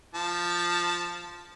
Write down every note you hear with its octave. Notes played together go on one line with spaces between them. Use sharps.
F3 A5